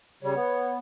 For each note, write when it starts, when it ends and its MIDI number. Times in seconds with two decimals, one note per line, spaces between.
0.23 0.34 49
0.23 0.34 55
0.23 0.73 73
0.36 0.78 59